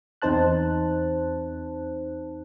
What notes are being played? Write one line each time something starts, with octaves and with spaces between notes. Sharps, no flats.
E2 C4 D#4 C5 A5 F#6